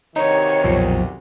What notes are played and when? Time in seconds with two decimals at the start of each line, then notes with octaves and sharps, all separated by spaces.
0.16 D2 C3 D#3 D#4 C#5
0.64 B1 F2 A#2 F3